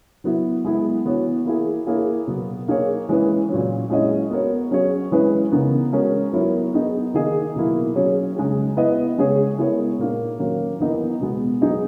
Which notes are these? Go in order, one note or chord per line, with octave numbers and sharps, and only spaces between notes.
F#3 B3 E4
G#3 B3 E4
E3 B3 F#4 C#5
A#3 E4 G#4
A#3 E4 G#4 C#5
B2 F#3 B3
A#3 D#4 G#4 C#5
E3 G#3 C#4 E4 B4
A#2 F#3 C#4
G#3 C#4 E4 G#4 D#5
B3 F#4 A#4 C#5
F#3 C#4 G#4 C#5
E3 G#3 C#4 E4 B4
C#3 E3 B3 D#4 A#4
G#3 C#4 F#4 A#4
F#3 B3 E4 A#4 C#5
B3 D#4 G#4 D#5
D#3 A#3 D#4 G#4 D#5
B2 F#3 A#3 E4
F#3 C#4 G#4 C#5
C#3 G#3 D#4 G#4
B3 E4 B4 D#5
C#3 G#3 C#4 G#4 C#5
G#3 B3 E4 A#4 C#5
A#2 A#3 D#4
D#3 F#3 A#3 C#4
E3 B3 D#4 A#4 D#5
B2 G#3 B3
F#3 B3 D#4 G#4 D#5